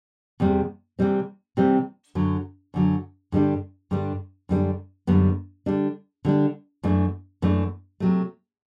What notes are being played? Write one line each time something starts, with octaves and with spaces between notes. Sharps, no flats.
E2 C3 G3
C3 E3 G3 C4
C3 E3 G3 C4
F#2 D3 F#3
F#2 D3 F#3
G2 D3 G3 D4
G2 D3 G3 D4
F#2 D3 G3 B3 D4
F#2 D3 G3 B3 D4
D3 G3 D4
D3 G3 D4
F#2 E3 A3 D4
F#2 E3 A3 D4
C3 F#3 A3